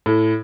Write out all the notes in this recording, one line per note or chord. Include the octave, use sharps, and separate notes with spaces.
A2